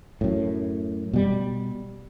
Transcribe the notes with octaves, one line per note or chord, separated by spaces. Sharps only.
F#2 A2
B2 G3